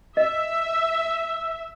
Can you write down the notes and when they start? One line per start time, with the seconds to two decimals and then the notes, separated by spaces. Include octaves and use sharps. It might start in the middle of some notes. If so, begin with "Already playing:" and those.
0.17 D#5 E5